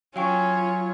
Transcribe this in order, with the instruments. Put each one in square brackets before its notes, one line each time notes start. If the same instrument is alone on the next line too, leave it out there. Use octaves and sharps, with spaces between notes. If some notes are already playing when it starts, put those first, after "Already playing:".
[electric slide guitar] F#3 [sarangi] C#4 [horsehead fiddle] F4 C#5 [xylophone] F5 G5 C#6